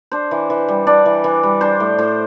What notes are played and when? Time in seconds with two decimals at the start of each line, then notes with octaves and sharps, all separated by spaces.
0.12 D4 C5
0.31 E3
0.50 E3
0.68 G3
0.87 D4 D5
1.06 E3
1.24 E3
1.43 G3
1.61 D4 C5
1.80 A2
1.98 A2 C5